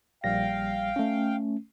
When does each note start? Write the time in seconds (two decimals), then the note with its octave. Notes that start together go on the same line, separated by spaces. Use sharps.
0.24 A#1 G3 F5 G5 A#6
0.96 A3 C#4